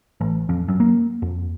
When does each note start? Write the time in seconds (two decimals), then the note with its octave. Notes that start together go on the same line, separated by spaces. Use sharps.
0.21 A1
0.49 F2
0.68 F#2
0.80 A#3
1.22 F2